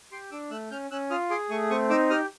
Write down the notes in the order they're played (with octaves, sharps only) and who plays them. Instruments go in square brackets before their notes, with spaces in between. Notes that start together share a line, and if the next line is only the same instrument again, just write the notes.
[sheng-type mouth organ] G4 C6 D6
D4 D6 E6
A3 E6 F#6
C#4 F6 G6
C#4 E6 F#6
F4 D#6 F6
G#4 C6 D6
A3 C#6 D#6
C4 C#6 D#6
D#4 D6 E6
G4 D#6 F6